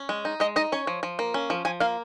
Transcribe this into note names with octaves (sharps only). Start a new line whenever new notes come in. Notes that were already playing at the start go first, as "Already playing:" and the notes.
Already playing: C#4
G#3
D#4
G#3 D#5
D#4 D#5
C#4 C#5
F3
F3
A#3
C#4
F3
F3 G#5
A#3 F5